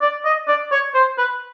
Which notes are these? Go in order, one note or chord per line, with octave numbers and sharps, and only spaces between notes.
D5
D#5
D5
C#5
C5
B4